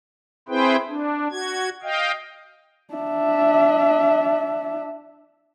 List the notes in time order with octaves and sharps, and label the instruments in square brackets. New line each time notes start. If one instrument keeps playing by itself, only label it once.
[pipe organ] C4 E4 G#4 B4 C5 G5
D4
F#4 G#6
D#5 F5 G5
[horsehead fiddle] D4 E5